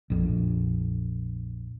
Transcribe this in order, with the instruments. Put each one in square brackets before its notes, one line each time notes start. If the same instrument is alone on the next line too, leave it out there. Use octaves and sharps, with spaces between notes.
[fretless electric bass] A#1 F2